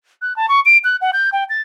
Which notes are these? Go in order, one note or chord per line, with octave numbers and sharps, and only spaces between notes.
F#6
A5
C#6
D7
F#6
F#5
G6
G5
A6